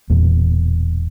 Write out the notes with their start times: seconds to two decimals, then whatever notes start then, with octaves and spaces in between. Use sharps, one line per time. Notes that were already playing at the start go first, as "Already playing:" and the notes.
0.10 E1 E2 A#2